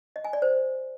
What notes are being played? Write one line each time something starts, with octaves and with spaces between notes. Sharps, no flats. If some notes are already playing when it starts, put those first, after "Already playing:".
D#5
G#5
D5
C5